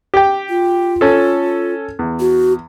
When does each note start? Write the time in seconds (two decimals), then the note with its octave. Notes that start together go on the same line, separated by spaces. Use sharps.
0.14 G4 G5
0.49 F4
1.01 C#4 A4
1.99 E2
2.20 F#4